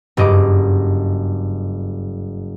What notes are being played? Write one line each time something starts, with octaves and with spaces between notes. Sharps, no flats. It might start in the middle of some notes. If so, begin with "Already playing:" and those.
F#1 G2 D#5 D6